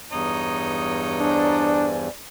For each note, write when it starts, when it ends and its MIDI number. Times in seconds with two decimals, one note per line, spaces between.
0.12 2.09 40
0.12 2.09 43
0.12 1.90 63
0.12 1.90 73
0.12 1.90 82
0.12 0.90 87
1.20 1.87 62
1.20 2.08 72
1.20 2.08 74
1.20 2.08 80